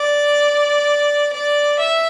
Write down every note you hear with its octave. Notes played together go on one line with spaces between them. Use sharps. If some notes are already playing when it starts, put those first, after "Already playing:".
Already playing: D5
D5
E5